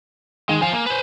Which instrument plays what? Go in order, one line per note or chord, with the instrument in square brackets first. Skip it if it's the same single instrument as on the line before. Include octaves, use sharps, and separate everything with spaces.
[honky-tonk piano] D#3 [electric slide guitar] G#3
[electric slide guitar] F3 F5 [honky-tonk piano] G#5
[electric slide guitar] A#3
B4 C5